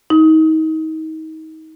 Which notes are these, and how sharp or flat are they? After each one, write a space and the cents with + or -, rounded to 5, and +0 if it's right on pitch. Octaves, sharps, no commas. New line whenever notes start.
D#4 +30